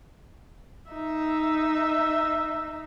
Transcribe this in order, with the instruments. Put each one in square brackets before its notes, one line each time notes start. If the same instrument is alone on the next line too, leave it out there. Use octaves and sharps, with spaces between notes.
[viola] D#4 E5